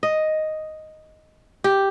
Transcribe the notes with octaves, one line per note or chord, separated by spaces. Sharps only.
D#5
G4